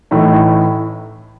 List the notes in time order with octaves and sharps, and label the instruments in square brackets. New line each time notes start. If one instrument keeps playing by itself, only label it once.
[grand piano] A1 A2 E3 A3 D#4